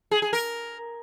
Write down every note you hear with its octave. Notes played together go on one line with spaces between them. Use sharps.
G#4
G#4
A#4